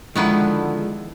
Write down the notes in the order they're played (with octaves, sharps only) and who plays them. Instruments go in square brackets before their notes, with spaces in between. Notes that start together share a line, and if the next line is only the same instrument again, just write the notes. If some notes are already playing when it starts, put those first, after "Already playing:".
[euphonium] D3 [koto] D#3 B3 E4 [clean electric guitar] F3 [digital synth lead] G#3